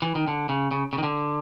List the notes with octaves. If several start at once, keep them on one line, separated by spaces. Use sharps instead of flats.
E3
D#3
D3
C#3
C#3
C#3
D#3
D3